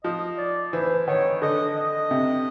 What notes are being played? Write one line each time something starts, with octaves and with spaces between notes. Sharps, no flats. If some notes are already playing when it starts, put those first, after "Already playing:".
F3 D#5
D5
E3 C5
D#3 C#5
D3 D#5
D#5
C3